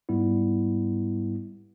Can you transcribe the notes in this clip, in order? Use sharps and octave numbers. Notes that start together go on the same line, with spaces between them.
G#2 G3 B3 E4